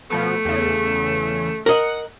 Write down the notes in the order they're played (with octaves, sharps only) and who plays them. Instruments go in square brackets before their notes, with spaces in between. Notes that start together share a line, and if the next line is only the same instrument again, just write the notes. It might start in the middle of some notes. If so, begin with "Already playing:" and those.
[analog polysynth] B2 F3 B3 [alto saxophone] A3
[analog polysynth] E2 C#3
[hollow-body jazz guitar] A#4 D#5 [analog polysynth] F#5